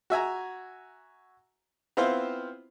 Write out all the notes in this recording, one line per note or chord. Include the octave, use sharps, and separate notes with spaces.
F#4 E5 G#5 A#5
B3 C4 E4 F4 C5 F5